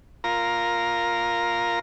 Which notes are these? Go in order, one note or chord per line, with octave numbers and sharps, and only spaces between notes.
F4 A#4 A#5